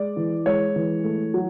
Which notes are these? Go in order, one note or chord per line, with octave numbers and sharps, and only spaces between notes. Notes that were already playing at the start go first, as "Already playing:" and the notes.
Already playing: G#3 D5
E3
G#3 C#5
E3
A3
F#3